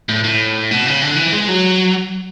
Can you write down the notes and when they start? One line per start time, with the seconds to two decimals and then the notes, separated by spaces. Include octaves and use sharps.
0.09 A2
0.24 A2
0.71 B2
0.86 C#3
1.02 D3
1.16 E3
1.32 G#3
1.48 F#3